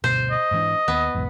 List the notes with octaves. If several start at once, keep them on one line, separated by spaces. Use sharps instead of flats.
D2 G2 B2 C5
D#5
G#2 E3 D4
D#2 B3
B1 E2 G#2